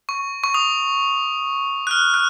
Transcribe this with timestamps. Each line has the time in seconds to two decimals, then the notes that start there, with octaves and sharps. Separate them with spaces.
0.09 C#6
0.44 C#6
0.54 D#6
1.87 F#6
1.91 F6
2.14 F#6